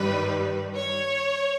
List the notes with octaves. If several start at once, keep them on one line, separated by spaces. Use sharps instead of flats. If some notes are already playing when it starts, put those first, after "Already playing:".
Already playing: G2 D#3 G3 B4
C#5